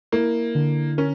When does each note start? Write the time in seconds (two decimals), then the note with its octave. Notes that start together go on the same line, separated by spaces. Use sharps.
0.12 A#3 E4
0.55 D3
0.98 C#4 A#4